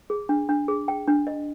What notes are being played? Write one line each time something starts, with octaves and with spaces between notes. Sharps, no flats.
G#4
D4
D4
G#4
G5
D4
D#5